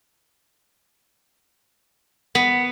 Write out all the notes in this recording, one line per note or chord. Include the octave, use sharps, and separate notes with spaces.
B3